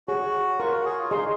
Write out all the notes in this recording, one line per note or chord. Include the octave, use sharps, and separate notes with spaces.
F#4 G#4 C#5 G#5
F4 A#4 C#5 F#5 A#5 C#6
F#4
G#4
F4
D#4 G#4 D#5 G#5 C6